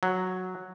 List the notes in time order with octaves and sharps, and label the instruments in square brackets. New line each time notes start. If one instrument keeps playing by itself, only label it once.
[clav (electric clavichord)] F#3